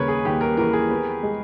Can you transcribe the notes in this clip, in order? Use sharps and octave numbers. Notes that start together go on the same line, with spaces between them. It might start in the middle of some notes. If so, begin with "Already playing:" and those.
Already playing: D#2 C#3 A#4 B4 C#5
G#4
D#2 G4
A#4
E3 A#4
G#4
B3
G#3